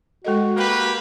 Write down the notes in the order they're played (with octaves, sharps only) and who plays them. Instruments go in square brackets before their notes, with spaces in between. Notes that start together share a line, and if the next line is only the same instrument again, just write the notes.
[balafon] G#3 A4 D#5 [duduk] F#4
[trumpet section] A#3 G4 B4